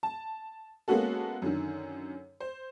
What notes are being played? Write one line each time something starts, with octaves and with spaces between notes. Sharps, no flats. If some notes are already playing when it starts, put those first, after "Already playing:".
A5
G#3 A#3 B3 C#4 F#4 A4
F#2 D3 D#3
C5